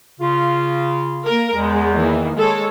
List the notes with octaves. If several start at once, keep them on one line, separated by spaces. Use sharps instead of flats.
C#3 F4
A#3 A#4
E2 G#3
D#3 E3 A#3
G#3 A4 C#5